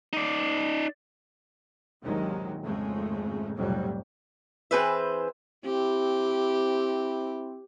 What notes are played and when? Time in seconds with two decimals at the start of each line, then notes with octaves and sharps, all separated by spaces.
0.13 D#4 D5
2.01 A#1 D#2 C3 D#3 F#3 G#3
2.62 G#1 F2 C#3 G#3 A3
3.56 F1 B1 F2 A2 F#3 G3
4.71 E3 C4 G#4 B4 C5 E5
5.65 C4 E4 G4